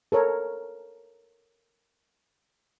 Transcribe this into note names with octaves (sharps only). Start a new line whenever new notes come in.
A4 A#4 C#5